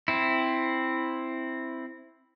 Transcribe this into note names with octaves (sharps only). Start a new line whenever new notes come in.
C4 E4